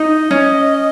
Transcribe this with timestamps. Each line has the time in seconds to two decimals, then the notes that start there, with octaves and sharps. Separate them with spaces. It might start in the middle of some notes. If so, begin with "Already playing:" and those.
Already playing: D#4 D#5
0.31 C#4